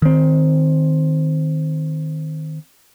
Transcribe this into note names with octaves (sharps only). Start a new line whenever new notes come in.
D#3 C4